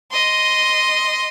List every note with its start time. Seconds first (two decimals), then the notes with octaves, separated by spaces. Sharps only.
0.11 D#5 C6